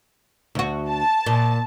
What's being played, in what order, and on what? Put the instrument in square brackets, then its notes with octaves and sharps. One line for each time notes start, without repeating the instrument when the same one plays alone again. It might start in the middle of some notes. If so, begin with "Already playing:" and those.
[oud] D2 F#4
[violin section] A5
[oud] A#2